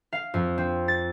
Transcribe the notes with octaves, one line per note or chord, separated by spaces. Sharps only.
F5
F2
C4
A6